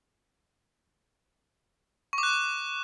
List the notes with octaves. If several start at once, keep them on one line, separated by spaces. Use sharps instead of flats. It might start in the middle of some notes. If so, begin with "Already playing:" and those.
C#6
D6
F#6